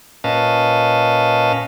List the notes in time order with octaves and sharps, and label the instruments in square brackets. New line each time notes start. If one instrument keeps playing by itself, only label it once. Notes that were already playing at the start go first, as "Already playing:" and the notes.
[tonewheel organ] A#2 C#4 B4 D#5 F5 A5